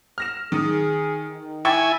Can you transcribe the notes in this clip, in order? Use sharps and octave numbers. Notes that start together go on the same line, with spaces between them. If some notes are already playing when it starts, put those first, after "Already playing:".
F6 A#6 E7
D#3 G#4 D#6
D#3
E4 G5 G#5 C#6 A6